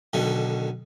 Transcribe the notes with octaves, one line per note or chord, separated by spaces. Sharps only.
B1 B2 D3 D#3